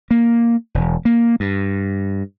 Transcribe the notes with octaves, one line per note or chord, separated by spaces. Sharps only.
A#3
E1
A#3
G2